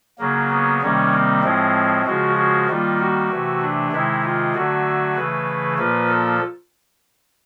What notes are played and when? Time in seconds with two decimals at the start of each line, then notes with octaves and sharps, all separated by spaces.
0.19 C#3 F#3 A#3
0.50 B3
0.82 C3 D#3 G3 A#3 C#4
1.13 C4
1.43 A2 F3 G#3 C4
2.05 C#3 F3 G#3 F#4
2.37 F#4
2.67 D#3 G3 A#3 F4
2.99 F#4
3.29 C3 E3 A3
3.61 D4
3.92 C3 D#3 G#3 E4
4.24 F4
4.54 D3 F#3 A3 F#4
5.16 C#3 E3 A3 B4
5.78 A#2 F3 A#3 B4
6.09 A4